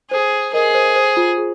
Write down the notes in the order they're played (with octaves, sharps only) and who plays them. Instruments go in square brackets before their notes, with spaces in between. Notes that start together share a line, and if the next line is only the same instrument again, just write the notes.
[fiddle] G#4 [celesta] C5
[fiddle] G#4 [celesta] A#4 D#5
[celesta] C5
C5
F4
G#4